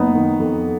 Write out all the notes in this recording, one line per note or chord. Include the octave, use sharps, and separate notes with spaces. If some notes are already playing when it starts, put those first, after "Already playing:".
Already playing: F#1 B3 D#4
D#3
F2